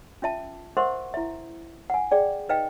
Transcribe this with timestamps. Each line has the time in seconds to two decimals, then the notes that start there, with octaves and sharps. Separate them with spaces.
0.22 C#4 F4 E5 A5
0.77 A#4 C5 E5 F#5 C6 C#6
1.14 E4 E5
1.90 F#5 G#5
2.11 G#4 D5 G5
2.49 D#4 B4 D#5 F5 G5